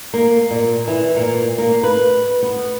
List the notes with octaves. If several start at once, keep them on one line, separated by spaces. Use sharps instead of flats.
A#3
A#2
E3
A#2
A#3
B4
B3